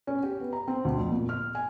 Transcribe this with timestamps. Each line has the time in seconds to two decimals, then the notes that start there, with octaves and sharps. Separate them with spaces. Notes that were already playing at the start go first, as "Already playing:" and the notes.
0.07 C#4
0.23 G4
0.40 B3
0.53 A#5
0.68 C4
0.85 D2
0.98 F2
1.11 A#2
1.29 F6
1.55 G#5